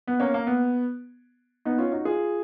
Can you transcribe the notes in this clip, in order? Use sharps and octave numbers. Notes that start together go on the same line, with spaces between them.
B3
A#3 C#4
A#3
B3
B3 D#4
C#4 F4
D#4 F#4
F4 G#4